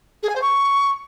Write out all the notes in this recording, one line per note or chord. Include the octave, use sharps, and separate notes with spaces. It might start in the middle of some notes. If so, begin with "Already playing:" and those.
G#4
G#5
C5
C#6